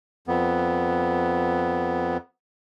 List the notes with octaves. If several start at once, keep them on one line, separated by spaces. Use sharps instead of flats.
F2 B3